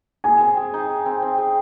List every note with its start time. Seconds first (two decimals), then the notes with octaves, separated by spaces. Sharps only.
0.24 G#4 G#5
0.41 C4
0.57 G#4
0.74 D#4
0.90 G#4
1.06 C4
1.23 C4
1.38 G#4